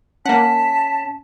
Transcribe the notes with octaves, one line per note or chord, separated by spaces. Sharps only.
A#3 C#4 F#5 A5 B6